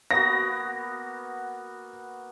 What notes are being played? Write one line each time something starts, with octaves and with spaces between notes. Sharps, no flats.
A#3 B3 F#4 A#6